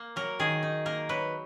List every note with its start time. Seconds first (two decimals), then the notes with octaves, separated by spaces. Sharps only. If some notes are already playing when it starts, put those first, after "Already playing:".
Already playing: A#3
0.16 F#3 A#4
0.39 D#3 G#4
0.63 D#4
0.86 A#3 A#4
1.09 F#3 B4